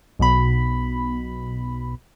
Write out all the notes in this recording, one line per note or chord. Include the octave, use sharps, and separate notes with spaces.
B1 B2 B5